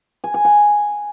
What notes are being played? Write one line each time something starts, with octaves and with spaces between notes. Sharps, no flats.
G#5
G#5
F#5